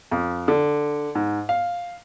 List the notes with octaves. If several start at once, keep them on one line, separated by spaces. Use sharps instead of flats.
F2
D3
G#2
F5